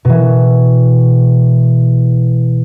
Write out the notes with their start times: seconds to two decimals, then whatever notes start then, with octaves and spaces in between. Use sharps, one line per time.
0.05 B2 E3